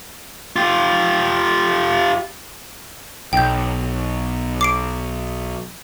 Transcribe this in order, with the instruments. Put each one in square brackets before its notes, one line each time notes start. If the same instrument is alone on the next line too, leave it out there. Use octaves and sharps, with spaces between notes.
[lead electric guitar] F4 G4
[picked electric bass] B1 [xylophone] G5 G6
[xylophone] D6 C7 D7